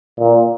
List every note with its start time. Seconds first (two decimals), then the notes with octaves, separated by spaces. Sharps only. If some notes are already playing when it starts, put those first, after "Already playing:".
0.19 A#2